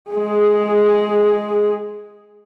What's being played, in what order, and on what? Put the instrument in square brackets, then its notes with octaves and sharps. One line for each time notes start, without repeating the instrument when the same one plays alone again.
[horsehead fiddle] G#3 G#4